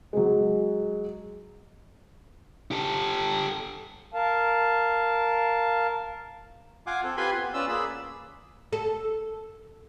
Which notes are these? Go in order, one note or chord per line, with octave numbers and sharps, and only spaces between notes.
F#3 G#3
G4 A4
A#4 F5 A5
F4 F5 F#5 G#5 D6
C4 A4
F4 G4 B4 G#5 B5 C6
B3
C#4 F4 B4 D5 E6
A#3 G#4 D5 B5 E6
A4